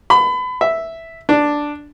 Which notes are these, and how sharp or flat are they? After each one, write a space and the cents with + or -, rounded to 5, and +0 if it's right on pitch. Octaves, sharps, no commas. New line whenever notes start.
B5 +30
E5 +0
D4 +0